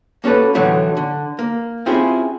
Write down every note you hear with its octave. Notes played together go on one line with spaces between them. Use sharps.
A#3 C#4 F#4 A4 B4
A2 D3 E3 F#3 A3
D3
A#3
C4 C#4 E4 F4 G4 G#4